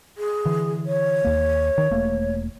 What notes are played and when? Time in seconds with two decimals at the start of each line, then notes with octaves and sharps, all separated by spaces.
0.17 G#4
0.45 D3 E3
0.86 C#5
1.25 D#2 A#3
1.78 D#3
1.91 E1 A3 A#3